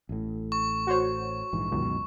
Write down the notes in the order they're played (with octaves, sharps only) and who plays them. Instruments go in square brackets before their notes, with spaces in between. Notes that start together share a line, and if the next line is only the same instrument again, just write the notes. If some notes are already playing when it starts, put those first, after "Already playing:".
[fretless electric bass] A1 A2
[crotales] C#6
[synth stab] F#4 C5 C#5
[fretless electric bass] A#1 G#2 E3
[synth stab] C#2 [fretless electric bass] F#2 B2 D#3